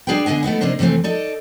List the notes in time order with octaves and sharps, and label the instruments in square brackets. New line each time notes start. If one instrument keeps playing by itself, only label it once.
[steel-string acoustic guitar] G3 D4 G#4 B4 G5
B2 D3 D4 D#5 G#5
A3 B3 D#4 E4
C3 A#3 D4 D#4 C5
C3 E3 G#3 A3 C4
D#4 A4 D5